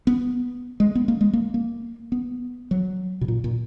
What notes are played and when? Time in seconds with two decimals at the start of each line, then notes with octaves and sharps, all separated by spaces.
0.07 B3
0.80 G#3
0.95 B3
1.08 A#3
1.21 G#3
1.33 A#3
1.54 A#3
2.12 B3
2.71 F#3
3.21 B2
3.28 A#2
3.44 A#2